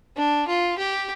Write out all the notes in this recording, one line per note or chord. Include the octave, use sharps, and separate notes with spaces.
D4
F4
G4